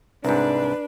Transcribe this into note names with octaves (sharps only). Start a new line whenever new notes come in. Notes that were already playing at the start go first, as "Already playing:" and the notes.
C2 G#2 D4 B4